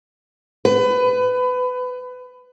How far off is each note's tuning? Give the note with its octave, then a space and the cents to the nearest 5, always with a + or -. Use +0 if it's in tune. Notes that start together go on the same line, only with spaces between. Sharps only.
B4 +25